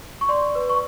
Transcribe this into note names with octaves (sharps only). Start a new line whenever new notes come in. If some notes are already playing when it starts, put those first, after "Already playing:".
C#6
D5 C6
B4
C#6